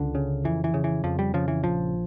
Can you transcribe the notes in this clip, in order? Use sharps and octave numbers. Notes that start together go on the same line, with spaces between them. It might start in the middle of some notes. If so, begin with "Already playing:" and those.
Already playing: C#2 D3
C#3
F2 E3
E3
C#3
E3
F2 F3
G3
C#3 F3
E3
A#1 F3